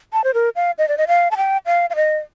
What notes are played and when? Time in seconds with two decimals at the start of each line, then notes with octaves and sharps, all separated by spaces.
0.13 A5
0.24 C5
0.34 A#4
0.56 F5
0.78 D#5
0.88 D5
0.98 D#5
1.08 F5
1.31 A5
1.37 G5
1.66 F5
1.90 F5
1.96 D#5